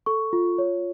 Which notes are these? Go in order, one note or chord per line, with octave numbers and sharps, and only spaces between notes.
A4 C#6
F4
C#5